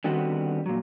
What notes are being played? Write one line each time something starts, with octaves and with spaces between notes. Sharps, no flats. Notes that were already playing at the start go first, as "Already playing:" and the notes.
D3 D#3 G3 B3 C4 F#4
A#2 F#3